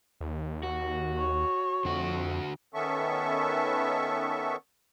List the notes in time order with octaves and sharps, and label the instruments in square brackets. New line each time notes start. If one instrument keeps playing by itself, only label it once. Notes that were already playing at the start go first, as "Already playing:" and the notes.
[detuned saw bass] D#2
[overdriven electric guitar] F#4
[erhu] C#5
[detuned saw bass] F2 [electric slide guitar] D3 F#4
[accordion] D#3 B3 C#4 A4 E5 C#6